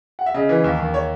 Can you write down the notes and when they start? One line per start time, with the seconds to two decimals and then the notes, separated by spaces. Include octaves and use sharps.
0.19 F#5
0.26 E5
0.34 C#3 D#5
0.49 E3
0.64 D#2
0.80 D#2
0.94 C#5